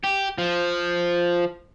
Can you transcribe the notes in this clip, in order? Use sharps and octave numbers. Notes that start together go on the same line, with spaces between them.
G4
F3